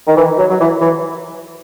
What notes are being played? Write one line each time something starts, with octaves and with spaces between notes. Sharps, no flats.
D#3
E3
F#3
F#3
E3
E3